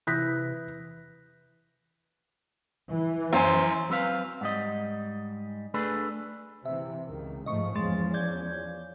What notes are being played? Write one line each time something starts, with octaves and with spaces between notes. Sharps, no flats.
C3 E3 E4 D#6 F#6 G6 A#6 B6
E3
F#2 C5 G#5
F#3 C4 B4 F5
G#2 G3 D#5
A3 D4 G#4 B4
C3 E3 E5
C#2 D#3
G#2 F3 A3 D#5 C#6
E2 F3 G#3 C#4 C6 A6
D5 G6 G#6